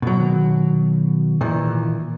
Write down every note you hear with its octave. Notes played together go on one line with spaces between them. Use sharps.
B2 F#3
D#3
A#2 D#3 E3